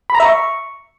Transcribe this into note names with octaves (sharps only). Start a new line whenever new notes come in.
B5
A#5
E5
C#6